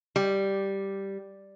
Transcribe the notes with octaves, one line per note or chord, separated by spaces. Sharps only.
G3